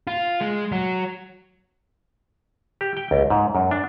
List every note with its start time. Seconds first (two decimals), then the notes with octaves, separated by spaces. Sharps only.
0.07 F4
0.41 G#3
0.72 F#3
2.81 G4
2.97 G5
3.11 C#2
3.30 G#2
3.55 F#2
3.71 D4